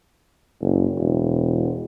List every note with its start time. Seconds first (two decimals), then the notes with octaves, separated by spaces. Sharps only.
0.61 F#1
0.98 E1